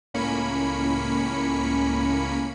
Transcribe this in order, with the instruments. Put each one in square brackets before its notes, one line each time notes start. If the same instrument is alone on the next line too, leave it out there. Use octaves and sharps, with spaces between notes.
[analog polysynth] C#2 A2 A#3 C#4 B5 C#7